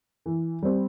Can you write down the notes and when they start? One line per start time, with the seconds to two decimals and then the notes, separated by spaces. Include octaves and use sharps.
0.26 E3
0.63 G3 C4